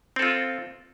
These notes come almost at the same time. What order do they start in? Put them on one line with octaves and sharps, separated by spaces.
C4 A4 F4